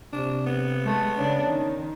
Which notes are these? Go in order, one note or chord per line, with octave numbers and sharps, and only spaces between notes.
C3 D4
B3
G#3 A3
C#3 C#4 D4
D#3